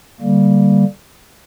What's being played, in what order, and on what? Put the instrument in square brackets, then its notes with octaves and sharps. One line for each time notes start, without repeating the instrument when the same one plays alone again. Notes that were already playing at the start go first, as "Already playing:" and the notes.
[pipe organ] D3 G3 A#3